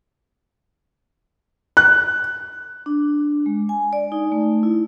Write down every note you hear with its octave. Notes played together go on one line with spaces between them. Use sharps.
F#6
D4
G#3
G#5
D5
D#4
A3
E4